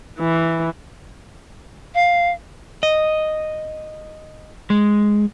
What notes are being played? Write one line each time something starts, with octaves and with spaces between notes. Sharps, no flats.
E3
F5
D#5
G#3